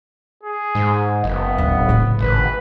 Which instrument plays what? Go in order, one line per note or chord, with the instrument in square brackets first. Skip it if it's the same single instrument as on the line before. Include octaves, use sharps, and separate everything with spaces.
[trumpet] G#4
[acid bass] G#2
[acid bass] F#1 [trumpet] B3
[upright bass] D1
A2 C#3
[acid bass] G#1 [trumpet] B4